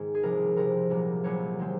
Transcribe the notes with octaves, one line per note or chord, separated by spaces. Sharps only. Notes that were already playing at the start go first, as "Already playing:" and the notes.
Already playing: G#2 D#3 G#3
G#4
C2 C3 F3 A#4
C2 C3 F3 A#4
C2 A#2 F#3 A#3
C2 A#2 F#3 A#3 C#5
D#3 G#3 C4